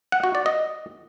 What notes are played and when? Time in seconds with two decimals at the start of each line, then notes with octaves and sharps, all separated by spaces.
0.12 F#5
0.24 F#4
0.35 D5
0.46 D#5